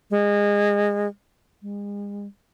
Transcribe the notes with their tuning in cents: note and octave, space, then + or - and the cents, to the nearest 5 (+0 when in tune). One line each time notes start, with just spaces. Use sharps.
G#3 -25
G#3 -40